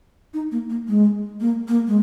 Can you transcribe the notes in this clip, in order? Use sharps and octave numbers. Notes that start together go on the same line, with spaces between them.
D#4
A#3
A#3
G#3
A#3
A#3
G#3